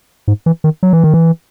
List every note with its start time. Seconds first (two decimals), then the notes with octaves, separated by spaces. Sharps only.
0.28 G#2
0.46 E3
0.64 D#3
0.83 F#3
0.93 E3
1.04 D#3
1.14 E3